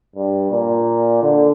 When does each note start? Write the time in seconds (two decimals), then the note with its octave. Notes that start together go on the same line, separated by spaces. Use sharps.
0.16 G2
0.52 A#2
1.22 D3